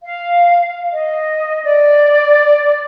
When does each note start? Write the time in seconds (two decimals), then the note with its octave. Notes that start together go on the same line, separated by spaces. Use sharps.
0.03 F5
0.93 D#5
1.64 D5